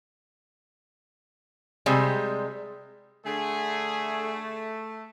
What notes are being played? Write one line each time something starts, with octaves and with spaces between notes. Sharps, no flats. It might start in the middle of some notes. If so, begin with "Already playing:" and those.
C3 G3 G#3
D3 A3 G#4